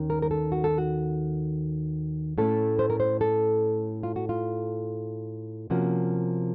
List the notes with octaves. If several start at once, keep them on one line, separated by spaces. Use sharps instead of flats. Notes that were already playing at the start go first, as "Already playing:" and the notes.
Already playing: D#2 D#3 C#4
A#4
A#4
A4
F#4
A4
F#4
A2 A3 C#4 A4
C5
A#4
C5
A4
F4
F#4
F4
C3 F3 A#3 C#4 F#4